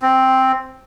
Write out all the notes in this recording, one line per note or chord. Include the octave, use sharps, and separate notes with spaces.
C4